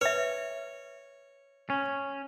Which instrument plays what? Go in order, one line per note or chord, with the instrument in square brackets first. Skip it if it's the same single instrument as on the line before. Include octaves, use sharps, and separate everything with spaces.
[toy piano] B4 E5 [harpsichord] C#5
[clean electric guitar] C#4